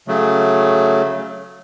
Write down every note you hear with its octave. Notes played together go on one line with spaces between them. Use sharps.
C#3 F#3 A3